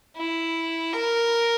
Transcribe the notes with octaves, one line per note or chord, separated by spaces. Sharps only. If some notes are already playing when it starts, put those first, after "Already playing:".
E4
A#4